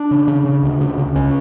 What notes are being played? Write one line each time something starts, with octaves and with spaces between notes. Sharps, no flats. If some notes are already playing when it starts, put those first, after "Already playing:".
Already playing: D4
C#3
C#3
C#3
D2
C#3
C#3
C#2 C#4